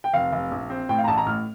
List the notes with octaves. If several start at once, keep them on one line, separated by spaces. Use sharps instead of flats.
G5
F1 F5
F1
A#1
C4
A2 G5
F5
A#5
A1 A5
A#5
A2 F6